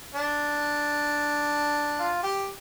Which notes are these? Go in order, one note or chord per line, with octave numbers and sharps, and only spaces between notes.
D4
F4
G4